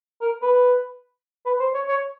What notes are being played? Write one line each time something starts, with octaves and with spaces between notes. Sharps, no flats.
A#4
B4
B4
C5
C#5
C#5